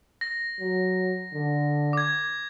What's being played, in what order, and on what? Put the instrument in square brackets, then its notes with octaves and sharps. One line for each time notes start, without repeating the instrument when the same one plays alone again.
[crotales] A#6
[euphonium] F#3
D3
[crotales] D6 G#6